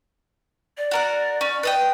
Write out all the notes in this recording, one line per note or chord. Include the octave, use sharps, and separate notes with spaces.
D5
F#4 A#4 F#5
C#4
B4 D#5 G5